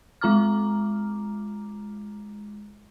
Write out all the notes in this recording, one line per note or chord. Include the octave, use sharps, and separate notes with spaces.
G#3 F4 A#5 D6 F6